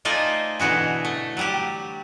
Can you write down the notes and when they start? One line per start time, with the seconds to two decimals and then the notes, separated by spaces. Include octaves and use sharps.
0.05 A3 D#4 F4 C5 D5 G#5
0.59 B2 D3 E3 F#4 G#4
1.05 A3
1.37 F#3 G3 G4